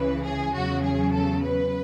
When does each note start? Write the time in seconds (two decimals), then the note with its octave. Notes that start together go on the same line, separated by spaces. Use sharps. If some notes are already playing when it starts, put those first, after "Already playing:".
Already playing: C#2 C#3 E3 B4
0.24 G#4
0.53 E2 C#3 F#3 F#4
0.82 G#4
1.12 A4
1.42 B4